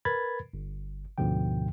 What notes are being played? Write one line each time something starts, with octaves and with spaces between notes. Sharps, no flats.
A#4 B4 B5 G#6 A6
G1
D2 G#2 B2 D3 F3 G5